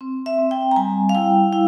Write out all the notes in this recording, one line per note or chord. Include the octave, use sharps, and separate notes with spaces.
C4
E5
C4
G5
A#5
G3 G#5
F5
E4 G5
E4 F5